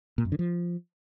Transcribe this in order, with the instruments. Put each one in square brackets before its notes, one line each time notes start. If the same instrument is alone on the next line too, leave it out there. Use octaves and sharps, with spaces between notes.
[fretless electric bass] A#2
F#2
D3
F3